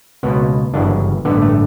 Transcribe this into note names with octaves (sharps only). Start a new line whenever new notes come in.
C#2 B2 B3
G1 F#2 C#3 E3 D4
A1 G2 D3 B3
A3